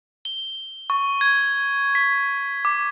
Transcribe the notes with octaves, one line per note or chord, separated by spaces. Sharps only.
G7
C#6
G#6
B6
D6